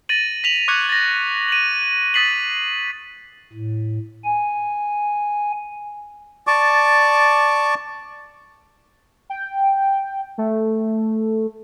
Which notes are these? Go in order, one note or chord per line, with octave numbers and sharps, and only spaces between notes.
A6 A#6 D#7 F#7
B6 F7 F#7
C#6 D6 F#6 G#6 C#7
A6 A#6
D#7 F7 F#7
D#6 A6 B6 C7 F#7
A2
G#5
D5 A5 C#6 D6
G5
A3